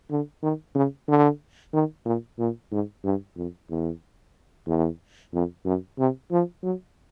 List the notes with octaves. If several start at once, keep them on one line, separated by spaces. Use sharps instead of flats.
D3
D#3
C#3
D3
D#3
A#2
A#2
G#2
G2
F2
E2
E2
F2
F#2
C3
F3
F#3